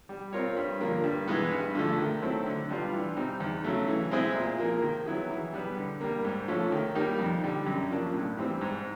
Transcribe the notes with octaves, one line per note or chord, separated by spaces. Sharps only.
G3
C4 F4 A#4 C#5
G2
D3 F3 A#3
G2
E3 G#3 B3
G2
D3 F3 A3
D#3
F#3 A3 C4 E4
D3
G3 B3 D4 F4
E3
G3 C4 D#4
E2
C#3 F#3 A3
E3
G#3 C4 E4 G#4
A#2
F3 A#3
D#3
F#3 B3 E4 G#4
E3
G3 B3
D3
G3 A#3
G#2
F3 A3 C#4
D#3
G3 A#3 D#4
F2
D3 G3
F#2
C#3 F3 A#3 D4
A2
E3 G3 C4
G#2